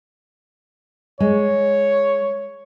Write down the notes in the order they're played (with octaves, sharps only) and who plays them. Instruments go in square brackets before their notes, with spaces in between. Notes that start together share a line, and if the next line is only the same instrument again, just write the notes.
[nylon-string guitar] G#3 [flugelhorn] C#5